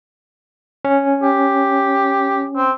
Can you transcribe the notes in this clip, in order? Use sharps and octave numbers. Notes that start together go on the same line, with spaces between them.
C#4
G4
C4